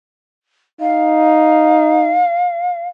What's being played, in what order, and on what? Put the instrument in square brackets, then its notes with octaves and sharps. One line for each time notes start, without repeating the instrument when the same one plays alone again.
[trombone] D#4 [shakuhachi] F5